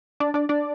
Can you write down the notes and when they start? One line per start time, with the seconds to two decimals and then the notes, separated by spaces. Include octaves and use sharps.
0.20 D4 D5
0.34 D4 D5
0.49 D4 D5